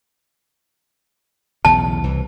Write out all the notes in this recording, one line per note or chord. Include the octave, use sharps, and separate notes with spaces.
B1 E2 C#3 A5
C2 E3